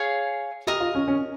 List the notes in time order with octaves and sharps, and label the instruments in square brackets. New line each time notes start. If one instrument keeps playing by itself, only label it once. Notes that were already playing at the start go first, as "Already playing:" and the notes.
Already playing: [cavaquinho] G#4 C#5 F5
[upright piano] G4 [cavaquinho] A#4 D#5 A#5
[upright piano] F4
C#4
C#4